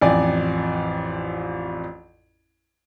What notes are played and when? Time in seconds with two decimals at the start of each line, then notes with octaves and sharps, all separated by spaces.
0.01 A1 F2 F3 D5 G#5